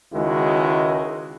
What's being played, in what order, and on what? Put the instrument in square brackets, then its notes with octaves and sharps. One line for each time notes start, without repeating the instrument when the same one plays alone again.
[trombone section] C#2 D#3 G#3 E4 F#4